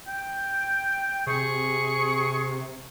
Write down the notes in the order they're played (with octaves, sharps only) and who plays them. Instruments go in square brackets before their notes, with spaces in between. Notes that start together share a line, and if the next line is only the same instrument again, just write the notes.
[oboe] G5
[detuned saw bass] C3 [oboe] G#4 [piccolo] C#6